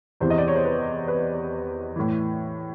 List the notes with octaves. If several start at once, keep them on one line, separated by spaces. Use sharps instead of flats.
E2 C3 E3 C5
D#5
D5
C#5
C5
B4
B4
A2 E3